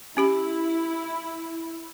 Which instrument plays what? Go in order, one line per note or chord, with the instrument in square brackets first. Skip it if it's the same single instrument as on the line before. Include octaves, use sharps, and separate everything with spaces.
[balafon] C#4 G4 B5 [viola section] E4